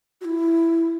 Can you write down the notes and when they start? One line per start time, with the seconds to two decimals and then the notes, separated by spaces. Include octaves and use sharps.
0.21 F#4
0.25 E4